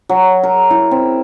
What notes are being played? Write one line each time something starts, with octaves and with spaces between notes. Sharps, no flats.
F#3
A#4
E4
C4